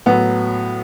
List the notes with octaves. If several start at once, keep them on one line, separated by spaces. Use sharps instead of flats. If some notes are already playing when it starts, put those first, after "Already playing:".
A2 F#3 B3